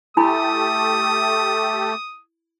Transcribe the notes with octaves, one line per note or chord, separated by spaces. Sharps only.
A3 E4 G4 A4 G#5 B5 D#6